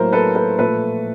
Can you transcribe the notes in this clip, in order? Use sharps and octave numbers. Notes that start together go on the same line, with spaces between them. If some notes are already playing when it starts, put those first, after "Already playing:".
Already playing: A2 F#3 A#3 A#4 C5
A4 B4
A4 B4
A#2 F3 A3 A4 B4